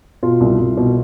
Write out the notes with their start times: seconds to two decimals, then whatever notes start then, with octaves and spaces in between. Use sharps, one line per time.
0.23 B2 F4
0.40 C2
0.59 C2
0.77 B2